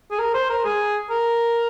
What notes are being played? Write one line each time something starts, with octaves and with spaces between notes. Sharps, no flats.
G#4
A#4
C5
A#4
G#4
A#4